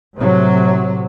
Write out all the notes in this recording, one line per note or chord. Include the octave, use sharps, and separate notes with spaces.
A2 C3 F#3